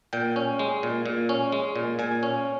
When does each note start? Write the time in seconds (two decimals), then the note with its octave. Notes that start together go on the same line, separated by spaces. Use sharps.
0.13 A#2 G5
0.36 C#4
0.59 G#3
0.83 A#2
1.06 A#2
1.29 C#4
1.52 G#3
1.76 A#2
1.99 A#2 G#5
2.23 C#4